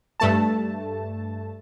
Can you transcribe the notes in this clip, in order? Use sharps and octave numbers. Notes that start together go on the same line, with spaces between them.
G2 A3 A5